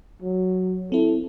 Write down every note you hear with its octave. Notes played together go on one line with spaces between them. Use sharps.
F#3
C4 E4 A4